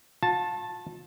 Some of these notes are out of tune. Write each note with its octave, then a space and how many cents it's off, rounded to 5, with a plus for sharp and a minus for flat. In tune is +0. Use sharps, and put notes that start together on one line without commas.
F4 +45 A5 +0